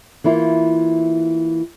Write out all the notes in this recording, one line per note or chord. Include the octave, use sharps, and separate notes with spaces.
E3 A#3 E4 F4